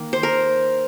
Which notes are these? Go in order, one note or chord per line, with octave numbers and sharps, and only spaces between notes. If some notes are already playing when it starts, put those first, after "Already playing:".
Already playing: D#3 A#3
C5
A#4